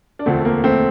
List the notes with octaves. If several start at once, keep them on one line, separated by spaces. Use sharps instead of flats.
D4
E1 D2 D3 F3 A3 C4
A#3
A3 C4